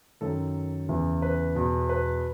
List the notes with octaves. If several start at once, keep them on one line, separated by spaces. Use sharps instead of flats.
F#2 D#3 A4
E2 C#3 E3
B4
E2 B2
B4